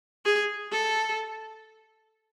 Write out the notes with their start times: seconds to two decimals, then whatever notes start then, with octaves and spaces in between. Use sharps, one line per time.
0.25 G#4
0.72 A4